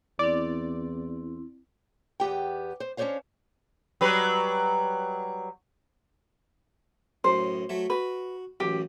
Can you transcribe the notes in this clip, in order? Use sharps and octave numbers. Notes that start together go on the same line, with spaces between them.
E2 C4 E4 D5
E2 B3 G4 G5
C5
C#4 D4 G4 C5 C#5 F5
F#3 G3 B4
F#2 A2 C5
F#3 A3 E5
F#4 B4
A1 F#2 G4